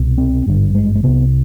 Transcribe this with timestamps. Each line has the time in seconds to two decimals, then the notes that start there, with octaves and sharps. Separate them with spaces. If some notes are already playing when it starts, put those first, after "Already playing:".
Already playing: C2 B2
0.18 C4
0.46 G#1 G2 D3
0.75 G#3
0.95 G#3
1.03 C2 C3 B3